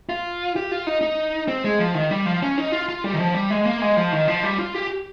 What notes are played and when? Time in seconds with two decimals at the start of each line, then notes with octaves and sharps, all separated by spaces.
0.09 F4
0.56 G4
0.71 F4
0.87 D#4
1.01 D#4
1.48 C4
1.64 G#3
1.79 F3
1.94 D#3
2.11 G3
2.26 F3
2.42 C#4
2.58 D#4
2.72 F4
2.89 F4
3.04 G3
3.13 D#3
3.19 F3
3.34 G3
3.50 G#3
3.65 A#3
3.82 G#3
3.97 F3
4.12 D#3
4.28 F3
4.43 G3
4.59 F4
4.75 G4